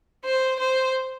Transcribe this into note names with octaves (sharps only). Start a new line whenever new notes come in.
C5
C5